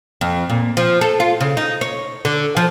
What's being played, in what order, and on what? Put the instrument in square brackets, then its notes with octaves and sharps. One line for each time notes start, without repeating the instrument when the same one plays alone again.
[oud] F2
A#2
F3
A4
F4
C#3
D#4
C#5
D3
F3